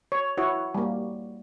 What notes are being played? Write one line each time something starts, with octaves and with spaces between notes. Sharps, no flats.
C#5
E4 F#4 C#5
G3 A#3